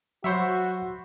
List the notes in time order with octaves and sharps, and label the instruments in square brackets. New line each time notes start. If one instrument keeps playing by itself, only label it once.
[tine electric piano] F#3 B5 G6 [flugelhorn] F#4 [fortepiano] C5 C#5 E5